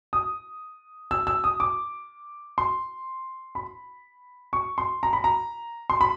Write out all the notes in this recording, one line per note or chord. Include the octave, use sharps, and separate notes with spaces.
D#6
E6
E6
D#6
D6
C6
B5
C#6
C6
A#5
B5
A#5
C6
B5